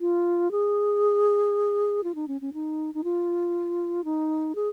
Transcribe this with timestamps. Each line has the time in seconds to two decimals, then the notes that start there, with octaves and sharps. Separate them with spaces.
0.01 F4
0.51 G#4
2.04 F4
2.15 D#4
2.28 C#4
2.41 C#4
2.54 D#4
2.94 D#4
3.04 F4
4.05 D#4
4.55 G#4